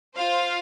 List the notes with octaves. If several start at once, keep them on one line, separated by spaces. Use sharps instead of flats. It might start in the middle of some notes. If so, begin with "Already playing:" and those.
F4 C5 F5